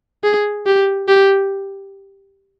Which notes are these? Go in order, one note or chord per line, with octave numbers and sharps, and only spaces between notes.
G#4
G4
G4